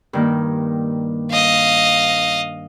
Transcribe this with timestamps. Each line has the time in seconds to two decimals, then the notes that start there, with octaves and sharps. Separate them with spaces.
0.13 G2 D#3 A#3
1.31 D#5 F5